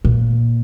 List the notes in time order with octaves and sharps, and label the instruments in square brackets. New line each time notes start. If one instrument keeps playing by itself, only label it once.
[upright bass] A#2